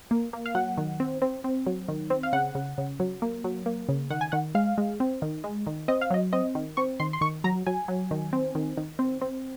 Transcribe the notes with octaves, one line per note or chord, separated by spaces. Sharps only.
A#3
A#3
F5
F#3 F#5
D#3
C4
C4
C4
F#3
D#3
C4
F5
C#3 F#5
C#3
C#3
F#3
A#3
F#3
A#3
C#3
D#3 F#5
G#5
D#3 F#5
G#3 F5
G#3
C4
D#3
G#3
D#3
C4 D#5
F5
F#3 D#5
C4 D#5
D#3
C4 C#6
D#3 C6
C6
D#3 C#6
F#3 A#5
F#3 G#5
F#3
D#3
C4
D#3
D#3
C4
C4